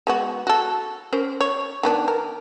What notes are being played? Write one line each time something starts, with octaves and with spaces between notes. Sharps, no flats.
G#3 B3 F#4
F#4 A4
C#4 A#4 C5
C#5
D#3 B3 D4
A#4